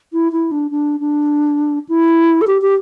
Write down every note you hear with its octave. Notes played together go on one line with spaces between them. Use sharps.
E4
E4
D4
D4
D4
E4
A4
G4
G4